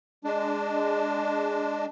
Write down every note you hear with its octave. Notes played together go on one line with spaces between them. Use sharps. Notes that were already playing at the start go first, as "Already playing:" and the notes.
G#3 D4